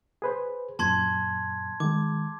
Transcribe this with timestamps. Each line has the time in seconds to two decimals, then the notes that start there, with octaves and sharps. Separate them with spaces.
0.22 G#4 B4 C5
0.79 F#2 A#2 A5 C6 G#6
1.80 D#3 G#3 D6